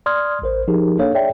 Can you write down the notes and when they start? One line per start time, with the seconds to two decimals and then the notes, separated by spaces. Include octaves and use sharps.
0.06 D5 C6 D#6 F6 G#6
0.42 A1 A#4 C5
0.68 F3 D#4 G4 G#4 A#4
0.98 A#3 D4 A4 C#5 F5
1.14 G#4 C#5 D5 E5 G5